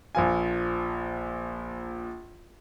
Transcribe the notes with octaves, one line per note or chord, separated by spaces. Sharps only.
A#1 F3 F4 G#5